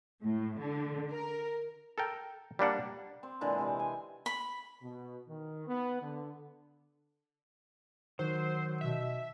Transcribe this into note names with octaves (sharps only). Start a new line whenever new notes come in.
A2
D3
A#4
A4 A#4 G5
G3 A#3 D4 F#5
C4
A#2 D3 E3 G#3
C3 C4
G#5
B5
B2
D#3
B3
D3
D#3 F#3 C5
B2 E5